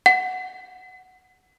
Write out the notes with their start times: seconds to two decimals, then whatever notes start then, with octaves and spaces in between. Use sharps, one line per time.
0.06 F#5